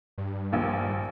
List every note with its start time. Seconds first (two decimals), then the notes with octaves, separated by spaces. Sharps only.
0.18 G2
0.52 A#1 D#2